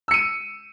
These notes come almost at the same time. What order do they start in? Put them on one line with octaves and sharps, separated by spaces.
E6 C#7 D#7